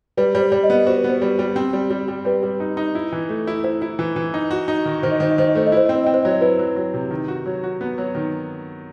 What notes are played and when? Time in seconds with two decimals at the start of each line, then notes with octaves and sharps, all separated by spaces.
0.17 G3 B4
0.35 G3
0.40 C5
0.52 G3
0.64 D#5
0.70 B3
0.87 F#4 C5
0.98 B4
1.04 B3
1.10 C5
1.22 G3
1.39 G3
1.56 C4
1.73 G3
1.90 G3
2.08 G3
2.25 G3 B4
2.43 G3
2.60 D#4
2.77 D#4
2.95 E4
3.12 E3
3.29 A3
3.47 E4
3.64 E4 C5
3.82 E4
3.99 E3
4.16 E3
4.34 D#4
4.51 F#4
4.68 D#4
4.85 D#3
5.03 D#3 C5
5.12 D#5
5.20 D#3 C5
5.31 D#5
5.38 D#3 C5
5.48 D#5
5.55 A3 C5
5.67 D#5
5.72 E4 C5
5.86 C4 D#5
5.95 C5
6.04 C4 D#5
6.14 C5
6.23 F#3 D#5
6.31 C5
6.41 E4 B4
6.59 F#3
6.76 F#3
6.94 C3
7.11 D#3
7.28 F#4
7.46 F#3
7.64 F#4
7.81 B3
7.98 F#3
8.15 D#3